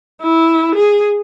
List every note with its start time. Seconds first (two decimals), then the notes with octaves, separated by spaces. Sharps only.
0.22 E4
0.76 G#4